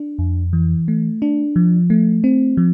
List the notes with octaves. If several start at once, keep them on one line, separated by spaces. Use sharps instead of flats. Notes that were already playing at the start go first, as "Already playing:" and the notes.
Already playing: D4
F2
E3
A3
D4
F3
A3
C4
F3